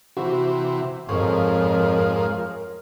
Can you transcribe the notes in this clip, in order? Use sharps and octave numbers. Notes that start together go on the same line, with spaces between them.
C3 E3 F#4
F2 G#2 F3 A#4 C#5